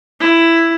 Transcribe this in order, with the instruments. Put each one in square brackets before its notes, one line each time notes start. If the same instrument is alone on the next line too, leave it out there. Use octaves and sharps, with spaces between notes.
[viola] E4